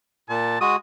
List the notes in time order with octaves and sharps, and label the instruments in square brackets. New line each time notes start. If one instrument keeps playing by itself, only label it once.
[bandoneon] A#2 [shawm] A5
[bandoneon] G#3 F#4 [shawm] D#6